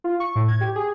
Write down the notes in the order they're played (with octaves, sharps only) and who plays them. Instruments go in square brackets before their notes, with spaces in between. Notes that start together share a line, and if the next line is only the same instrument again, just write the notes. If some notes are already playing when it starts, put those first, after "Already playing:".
[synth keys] F4
C#6
A2
G#6
G4
G#4